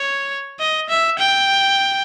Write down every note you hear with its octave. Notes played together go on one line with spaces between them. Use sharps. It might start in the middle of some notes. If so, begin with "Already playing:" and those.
Already playing: C#5
D#5
E5
G5